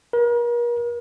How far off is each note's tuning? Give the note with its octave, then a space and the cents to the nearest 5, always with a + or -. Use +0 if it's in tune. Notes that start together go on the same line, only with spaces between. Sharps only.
A#4 +40